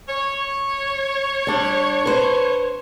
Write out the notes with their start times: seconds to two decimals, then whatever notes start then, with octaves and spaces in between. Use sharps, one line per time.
0.08 C#5
1.47 G3 D4
2.06 B4 C5